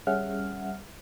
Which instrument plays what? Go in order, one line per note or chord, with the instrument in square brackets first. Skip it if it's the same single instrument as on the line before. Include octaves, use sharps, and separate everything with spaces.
[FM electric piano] G3 C#4 G#4 E5 F#5 F6